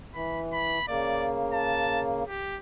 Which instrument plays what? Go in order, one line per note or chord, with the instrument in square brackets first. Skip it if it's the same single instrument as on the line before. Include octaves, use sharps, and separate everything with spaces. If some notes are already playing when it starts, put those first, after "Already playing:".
[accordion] E3 [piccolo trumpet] B5
[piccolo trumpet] B5
[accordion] C#3 A#3 [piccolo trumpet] D5
[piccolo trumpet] A5
G4